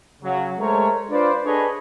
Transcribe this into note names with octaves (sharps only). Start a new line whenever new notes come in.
C#3 F#3
G#3 A3 A#4 C5 C#5
D4 F4 B4 C5 D5
D4 G#4 A4 B4 C#5 D#5